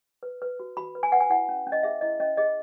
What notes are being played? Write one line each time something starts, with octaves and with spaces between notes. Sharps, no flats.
B4
B4
F#4
F#4 B5
B4
G#5
B4 F#5
G#5
E4 F#5
C#4
C#4
D#5
G#4 E5
E4 D#5
C#4 D#5
G#4 D#5